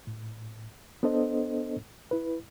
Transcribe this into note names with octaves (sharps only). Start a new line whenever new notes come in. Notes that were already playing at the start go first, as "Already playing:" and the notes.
A2
B3 D4 A4 C5 D#5
E4 B4